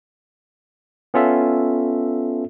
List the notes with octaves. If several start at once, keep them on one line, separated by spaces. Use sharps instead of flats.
B3 C#4 F4 A4 E5